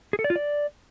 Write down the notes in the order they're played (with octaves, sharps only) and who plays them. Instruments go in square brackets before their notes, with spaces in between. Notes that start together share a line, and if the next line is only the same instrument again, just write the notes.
[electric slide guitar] G#4
A4
D5
F4
D5